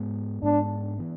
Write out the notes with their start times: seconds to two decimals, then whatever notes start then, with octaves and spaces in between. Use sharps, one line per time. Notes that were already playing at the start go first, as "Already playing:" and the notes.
Already playing: G#2 G#3 B3
0.43 G#2 G#3 B3 D4
0.98 E3 B3